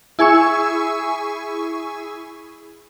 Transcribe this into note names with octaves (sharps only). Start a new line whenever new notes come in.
E4 G#4 G#5 C#6 E6